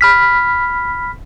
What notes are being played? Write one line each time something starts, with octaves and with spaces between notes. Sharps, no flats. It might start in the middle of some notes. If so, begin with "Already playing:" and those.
B5 F6 B6